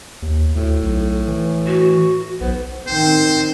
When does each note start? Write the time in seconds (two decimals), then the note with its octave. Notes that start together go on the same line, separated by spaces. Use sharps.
0.22 D#2
0.56 D2 A2
0.82 B1
1.28 E3
1.66 F#4
2.41 B1 B3 C5
2.88 D#3 C4 C5